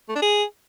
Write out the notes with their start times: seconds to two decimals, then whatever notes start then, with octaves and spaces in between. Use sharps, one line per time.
0.09 A3
0.15 D4
0.22 G#4